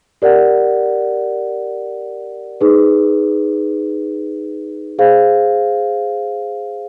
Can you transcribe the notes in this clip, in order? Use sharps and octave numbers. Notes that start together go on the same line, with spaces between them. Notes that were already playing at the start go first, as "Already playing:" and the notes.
G4 A#4 D5 F#5
D#4 G#4 B4
G#4 C5 F5